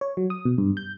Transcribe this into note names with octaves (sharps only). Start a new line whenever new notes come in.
C#5
F#3
D#6
B2
G2
G6